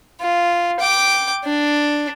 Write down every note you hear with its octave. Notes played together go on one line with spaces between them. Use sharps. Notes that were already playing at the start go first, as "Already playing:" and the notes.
F4
G5 D6
D4